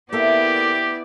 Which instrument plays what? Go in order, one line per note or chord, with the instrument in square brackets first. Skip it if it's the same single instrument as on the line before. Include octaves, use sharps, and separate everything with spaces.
[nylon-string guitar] A#3 A4 E5 [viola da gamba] B3 E4 D5 [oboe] G4